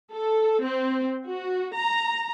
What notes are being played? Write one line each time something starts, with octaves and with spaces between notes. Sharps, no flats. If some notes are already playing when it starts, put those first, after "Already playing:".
A4
C4
F#4
A#5